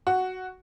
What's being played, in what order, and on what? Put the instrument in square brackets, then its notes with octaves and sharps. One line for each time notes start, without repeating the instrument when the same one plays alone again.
[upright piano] F#4